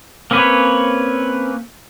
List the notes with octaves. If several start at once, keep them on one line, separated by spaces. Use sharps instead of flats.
A#3 C4 C#4 B4 C#5